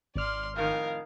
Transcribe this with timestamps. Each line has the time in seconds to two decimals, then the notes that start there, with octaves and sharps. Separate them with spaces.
0.16 G#1 D5 C6 F6
0.56 F2 A2 D#3 A#4 F5